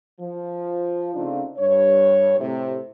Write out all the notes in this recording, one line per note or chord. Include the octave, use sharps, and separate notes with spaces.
F3
C#3 A3 C4 D4 D#4 F4
G2 C#5
A2 C3